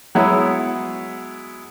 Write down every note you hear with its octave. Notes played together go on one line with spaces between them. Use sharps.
F#3 G#3 B3 E4 C#5